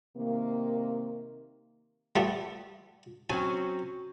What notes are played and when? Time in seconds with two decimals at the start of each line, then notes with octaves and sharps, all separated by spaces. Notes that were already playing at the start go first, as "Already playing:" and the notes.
0.17 C3 D#3 A#3
2.16 G3 A3 B3
3.30 F#3 C4 C#4 G#5